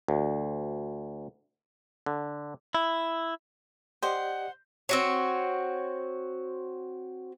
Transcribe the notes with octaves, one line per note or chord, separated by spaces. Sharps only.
D2
D3
E4
G4 C5 D5 D#5 F#5
C4 F#4 C#5